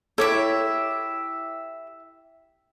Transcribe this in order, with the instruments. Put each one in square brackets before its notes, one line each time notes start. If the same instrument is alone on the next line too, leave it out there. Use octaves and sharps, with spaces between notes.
[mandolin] E4 G4 E5 [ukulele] A4 C#5